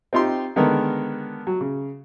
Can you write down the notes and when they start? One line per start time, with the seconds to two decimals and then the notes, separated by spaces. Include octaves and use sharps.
0.13 C4 D#4 F4 G4 C6
0.56 D3 D#3 G#3 B3 A#4
1.47 F#3
1.61 C#3